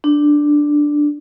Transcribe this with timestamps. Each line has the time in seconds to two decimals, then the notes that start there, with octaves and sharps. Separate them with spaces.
0.04 D4